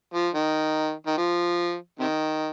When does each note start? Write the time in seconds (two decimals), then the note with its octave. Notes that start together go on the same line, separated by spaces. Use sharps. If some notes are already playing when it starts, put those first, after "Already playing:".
0.14 F3
0.35 D#3
1.07 D#3
1.17 F3
1.99 C3 D#3